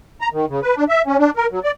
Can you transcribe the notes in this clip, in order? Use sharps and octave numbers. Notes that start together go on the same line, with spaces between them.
A#5
D#3
C#3
B4
D4
E5
C#4
D4
A#4
F#3
D5